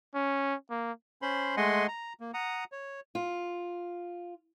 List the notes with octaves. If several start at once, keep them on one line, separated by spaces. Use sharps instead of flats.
C#4
A#3
C#4 C5 B5 C6
G#3 A3 D#5 F#5 G#5 C6
A#5
A#3
F#5 A#5 D#6
C#5
F4